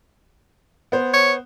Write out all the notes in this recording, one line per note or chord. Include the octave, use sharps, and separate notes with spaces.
B3 C5
C#5